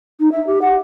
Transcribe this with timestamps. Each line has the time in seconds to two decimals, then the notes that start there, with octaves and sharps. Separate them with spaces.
0.20 D#4
0.32 E5
0.47 G4
0.62 F#5